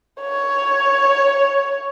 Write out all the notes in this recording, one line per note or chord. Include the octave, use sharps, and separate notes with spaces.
C#5